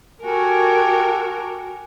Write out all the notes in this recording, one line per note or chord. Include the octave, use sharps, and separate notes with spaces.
F#4 G4 A4 A#4 G#5